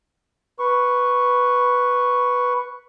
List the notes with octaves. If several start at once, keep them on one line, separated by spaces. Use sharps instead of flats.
B4 C#6